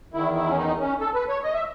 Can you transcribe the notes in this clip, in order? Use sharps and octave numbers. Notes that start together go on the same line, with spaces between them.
E2 D#3 E4
E4
C#4
D#4
C#4
A4
B4
C#5
D#5
E5